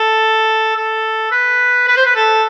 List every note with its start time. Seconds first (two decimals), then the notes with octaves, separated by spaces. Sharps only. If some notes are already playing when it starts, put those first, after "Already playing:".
Already playing: A4
0.76 A4
1.31 B4
1.88 B4
1.96 C5
2.05 B4
2.15 A4